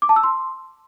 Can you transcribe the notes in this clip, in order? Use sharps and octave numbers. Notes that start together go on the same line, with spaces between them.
D6
A5
E6
C6